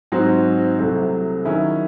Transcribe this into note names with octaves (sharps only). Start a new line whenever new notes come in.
G#2 F#3 C4 F#4
C2 C3 F#3 A3
D#3 F#3 C#4 E4 G#4